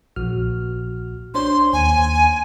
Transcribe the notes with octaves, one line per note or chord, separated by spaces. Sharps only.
A#1 F#4 F6
D4 C5 C#5 C6
D#2 G#5